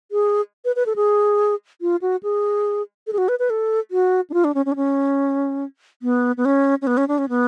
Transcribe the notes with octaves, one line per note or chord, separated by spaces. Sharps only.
G#4
B4
B4
A4
G#4
F4
F#4
G#4
A4
G#4
F#4
B4
B4
A4
F#4
D4
F4
D4
C#4
C#4
D4
C#4
B3
B3
C#4
C#4
B3
C#4
D4
C#4
B3